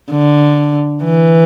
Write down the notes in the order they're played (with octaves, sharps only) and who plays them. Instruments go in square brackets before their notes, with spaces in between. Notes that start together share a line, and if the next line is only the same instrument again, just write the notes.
[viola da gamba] D3
E3